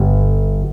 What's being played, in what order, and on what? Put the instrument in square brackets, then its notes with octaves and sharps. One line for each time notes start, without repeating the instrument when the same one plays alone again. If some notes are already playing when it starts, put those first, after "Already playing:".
Already playing: [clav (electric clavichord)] G1